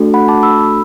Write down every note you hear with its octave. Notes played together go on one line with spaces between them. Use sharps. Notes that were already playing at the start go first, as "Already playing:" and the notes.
Already playing: A3 D4 F#4 A4
F#5 B5
A5 D6
B5 E6